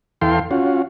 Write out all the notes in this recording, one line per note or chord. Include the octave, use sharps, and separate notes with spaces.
E2 E3 A4 F5 G5 C6
C#4 F4 F#4